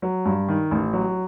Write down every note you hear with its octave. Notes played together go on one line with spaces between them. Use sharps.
F#3
G2
D#3
A1
F#3